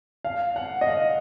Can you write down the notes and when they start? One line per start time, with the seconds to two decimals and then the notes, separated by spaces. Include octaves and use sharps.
0.25 F5
0.56 F#5
0.81 D#5
0.87 F5